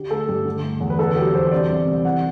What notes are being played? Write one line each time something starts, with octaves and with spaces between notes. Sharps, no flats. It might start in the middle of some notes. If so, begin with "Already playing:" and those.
Already playing: D3 G4
A3 A4
G2 G4
D3
A3
E2
B4
D3 A4
F#3 G4
E2 C5
C3 D5
G3
C2
E3 F#5